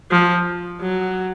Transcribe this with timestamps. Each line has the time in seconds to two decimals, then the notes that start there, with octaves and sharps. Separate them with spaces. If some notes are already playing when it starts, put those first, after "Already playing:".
0.11 F3
0.80 F#3